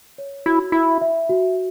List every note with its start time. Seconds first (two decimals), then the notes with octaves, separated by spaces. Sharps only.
0.18 C#5
0.46 E4 F#4
0.72 E4 E5
1.01 E5
1.30 F#4